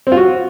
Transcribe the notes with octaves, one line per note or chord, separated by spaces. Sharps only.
C4
F4
F#4